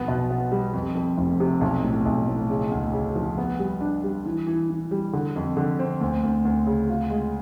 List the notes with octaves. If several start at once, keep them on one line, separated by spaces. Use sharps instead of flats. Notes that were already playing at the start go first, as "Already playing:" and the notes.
Already playing: B1 F3 B3
B2
B3
G3
F2
F2
F1
C3
B1
A2
B1
A2
C#3
D2
C#3
F3
B3
G3
D4
G3
E3
E3
E3
G3
D3
F2
D3
C4
D2
D2
D2
C#3
F4
G#3